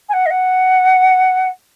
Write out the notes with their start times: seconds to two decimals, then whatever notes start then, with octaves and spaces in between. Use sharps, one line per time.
0.09 G#5
0.13 F#5
0.26 D#5
0.30 F#5